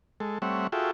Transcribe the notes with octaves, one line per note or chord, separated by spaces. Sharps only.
G#3 A4
G3 A3 C4 C#5 E5 F#5
F4 F#4 G#4 A4 E5 G5